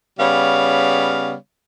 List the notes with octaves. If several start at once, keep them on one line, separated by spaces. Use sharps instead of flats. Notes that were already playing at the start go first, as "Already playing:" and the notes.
C#3 G3 B3 C#5 F5